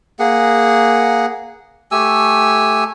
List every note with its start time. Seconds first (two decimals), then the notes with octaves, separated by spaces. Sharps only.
0.19 A#3 G#4 F#5
1.91 A3 G4 G#5 E6